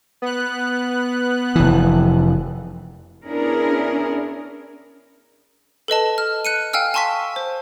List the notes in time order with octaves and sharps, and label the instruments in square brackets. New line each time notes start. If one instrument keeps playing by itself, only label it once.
[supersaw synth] B3 F#6
[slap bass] F1 E3
[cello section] B3 C#4 D4 E4 G#4 A#4
[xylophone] A4 B4 D#5 A5
F6
F#6 C#7 D#7
F5 G5 G#5 E6 F6
G#5 A5 C6 C#6 E6 B6
C5